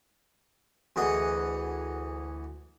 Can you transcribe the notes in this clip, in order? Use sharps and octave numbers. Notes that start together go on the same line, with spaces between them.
D2 E3 G#4 D#5 F#5 D#6